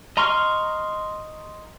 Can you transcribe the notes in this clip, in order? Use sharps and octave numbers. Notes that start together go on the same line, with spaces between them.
D#5 A#5 C6 C#6 F6